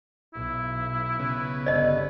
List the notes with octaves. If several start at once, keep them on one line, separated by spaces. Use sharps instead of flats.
B1 E4
C#3 B3
G1 D5 D#5